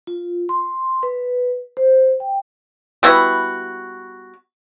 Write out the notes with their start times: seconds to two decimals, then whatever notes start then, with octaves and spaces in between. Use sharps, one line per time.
0.07 F4
0.49 C6
1.03 B4
1.77 C5
2.20 G5
3.03 G3 B3 E4 F#4